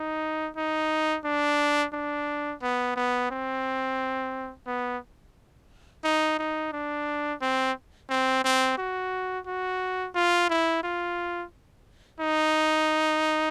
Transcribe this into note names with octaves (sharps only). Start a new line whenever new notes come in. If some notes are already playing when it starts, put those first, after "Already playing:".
Already playing: D#4
D#4
D4
D4
B3
B3
C4
B3
D#4
D#4
D4
C4
C4
C4
F#4
F#4
F4
E4
F4
D#4